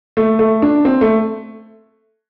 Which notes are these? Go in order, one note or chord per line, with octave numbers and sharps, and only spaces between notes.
A3
A3
D4
C4
A3